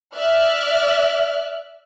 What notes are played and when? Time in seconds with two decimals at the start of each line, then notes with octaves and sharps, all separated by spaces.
0.15 D5 E5 F6 F#6